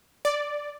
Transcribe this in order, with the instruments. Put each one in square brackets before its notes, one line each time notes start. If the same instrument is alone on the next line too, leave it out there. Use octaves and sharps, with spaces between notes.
[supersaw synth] D5